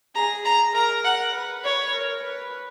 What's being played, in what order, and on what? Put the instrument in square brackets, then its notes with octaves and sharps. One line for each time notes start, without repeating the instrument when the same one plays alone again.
[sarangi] G#4 [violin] A#5
[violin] A#5
[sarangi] A#4 [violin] A#5
[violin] F#5
[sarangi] B4
[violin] C#5
[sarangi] A#4
B4